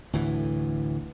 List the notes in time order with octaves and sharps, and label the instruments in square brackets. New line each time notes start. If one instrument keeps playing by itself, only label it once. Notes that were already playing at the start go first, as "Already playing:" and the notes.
[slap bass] D2 A2 E3